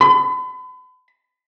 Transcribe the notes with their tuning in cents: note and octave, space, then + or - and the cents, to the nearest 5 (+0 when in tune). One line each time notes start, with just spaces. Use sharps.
B5 +40